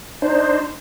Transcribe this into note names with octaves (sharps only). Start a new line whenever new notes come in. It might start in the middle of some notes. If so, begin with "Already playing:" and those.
D4 D#4 C5